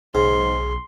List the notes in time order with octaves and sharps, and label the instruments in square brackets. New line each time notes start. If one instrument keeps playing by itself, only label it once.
[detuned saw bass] B1 [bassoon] G#2 [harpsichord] C#3 [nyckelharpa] C6